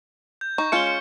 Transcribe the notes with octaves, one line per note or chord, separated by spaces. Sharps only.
G6
D#4 C#6
G#3 C#4 F4 C#7 G7
C#7